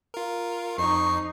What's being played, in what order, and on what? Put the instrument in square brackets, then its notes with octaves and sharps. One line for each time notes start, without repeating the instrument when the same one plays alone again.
[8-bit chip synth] F4 A#4
[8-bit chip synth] F2 C7 [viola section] D#4 [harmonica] C#6